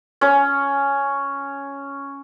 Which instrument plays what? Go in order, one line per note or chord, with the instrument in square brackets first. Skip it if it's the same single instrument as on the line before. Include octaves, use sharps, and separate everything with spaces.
[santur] C#4 C#5